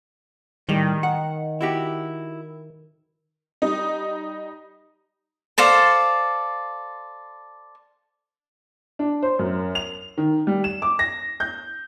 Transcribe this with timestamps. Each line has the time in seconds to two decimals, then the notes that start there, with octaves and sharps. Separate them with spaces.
0.68 A2 D#3 G3
1.03 F#5
1.61 E4 F#4 G4
3.62 G3 D#4
5.58 A4 C5 D5 F5
8.99 D4
9.23 C5
9.39 F#2
9.75 F7
10.18 D#3
10.47 G3
10.64 E7
10.82 D6
10.99 A#6
11.40 G6